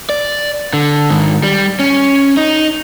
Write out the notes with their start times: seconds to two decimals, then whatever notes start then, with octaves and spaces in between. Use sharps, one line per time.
0.09 D5
0.73 D3
1.11 G#2 D#3
1.43 G3
1.79 C#4
2.37 D#4